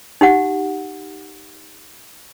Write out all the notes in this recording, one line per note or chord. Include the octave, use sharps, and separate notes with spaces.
D#4 G4 F#5